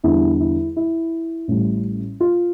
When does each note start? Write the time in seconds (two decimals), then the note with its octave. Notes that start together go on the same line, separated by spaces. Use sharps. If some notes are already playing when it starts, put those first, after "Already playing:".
0.04 E2 D3 G3 E4
0.40 E4
0.76 E4
1.48 A1 A2 G3
2.20 F4